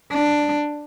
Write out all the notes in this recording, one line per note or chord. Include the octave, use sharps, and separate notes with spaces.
D4